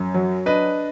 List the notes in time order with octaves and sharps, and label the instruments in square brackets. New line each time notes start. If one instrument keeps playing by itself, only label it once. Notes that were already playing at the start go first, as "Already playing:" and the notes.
Already playing: [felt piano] F#2
F#3
[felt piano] D4 [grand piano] B4 D#5